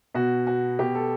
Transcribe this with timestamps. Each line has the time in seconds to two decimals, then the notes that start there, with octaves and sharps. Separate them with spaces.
0.15 B2 F#4
0.47 F#4
0.79 B2 G4
0.95 A4